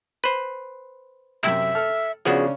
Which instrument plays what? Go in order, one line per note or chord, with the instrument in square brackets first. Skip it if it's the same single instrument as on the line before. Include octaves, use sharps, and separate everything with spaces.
[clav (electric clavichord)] B4 C5
[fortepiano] F#2 C3 [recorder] E5
[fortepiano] A4 F6
[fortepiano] C#3 C#4 D4 [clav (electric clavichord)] F3 B3 F#4 [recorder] G#4